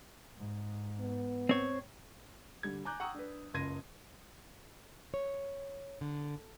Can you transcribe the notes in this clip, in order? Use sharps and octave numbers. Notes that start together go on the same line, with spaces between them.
G#2
B3
C4 C#5
D3 G3 G#6
G#5 A#5 D6 F#6 G6
F#5 G5 A#5 C#6 D#6 E6
D4 B4
F#1 C#2 C6 G#6 A#6 D#7
C#5
D3